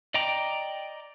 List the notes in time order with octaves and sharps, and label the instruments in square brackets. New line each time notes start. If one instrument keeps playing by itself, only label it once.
[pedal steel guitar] D5 D#5 G5 A#5 D6